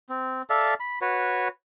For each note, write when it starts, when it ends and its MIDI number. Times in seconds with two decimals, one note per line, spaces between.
0.09 0.42 60
0.50 0.74 69
0.50 0.74 74
0.50 0.74 76
0.50 0.74 77
0.80 0.99 83
1.01 1.48 66
1.01 1.48 71
1.01 1.48 73